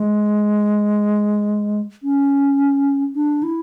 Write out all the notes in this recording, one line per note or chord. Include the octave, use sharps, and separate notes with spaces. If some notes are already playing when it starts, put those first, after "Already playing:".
Already playing: G#3
C#4
D4
E4